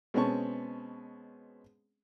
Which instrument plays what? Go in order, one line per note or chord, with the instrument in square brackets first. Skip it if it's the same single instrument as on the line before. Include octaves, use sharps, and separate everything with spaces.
[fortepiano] B2 G#3 C4 C#4 A5 C#6